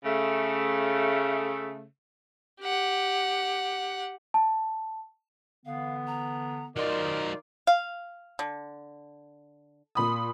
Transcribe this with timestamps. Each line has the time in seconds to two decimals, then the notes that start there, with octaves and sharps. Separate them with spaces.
0.04 C#3 A3
2.62 G4 F#5
4.34 A5
5.66 D3 E3 B3 F5
6.07 A#5
6.76 D#3 F#3 D#4 F4 A#4 C5 D5 D6
7.67 F5
8.39 D3
9.95 A#2 B5 D#6